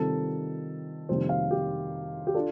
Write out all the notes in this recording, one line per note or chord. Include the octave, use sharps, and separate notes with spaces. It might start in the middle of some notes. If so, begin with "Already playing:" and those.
Already playing: C3 D#3 G3 C4 F4 A4
F2 C3 D#3 G3 A#3 C5
F5
G4
G4
D4 F4 A4